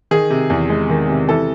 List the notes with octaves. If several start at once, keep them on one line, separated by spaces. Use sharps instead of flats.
D#3 G#4
C3
E2
G#3
D#3
C3
E3 A4